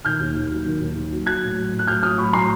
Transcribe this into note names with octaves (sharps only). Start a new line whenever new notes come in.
D#3 F6 G6
D#2
D#2
F#3
D#3
D#2
D#2
F#3
F#3 F#6 G#6
A2
F#3
A2
F#6
F#3 F6 G6
A2 D#6 F6
F#3 B5 C#6
A2 A#5 C6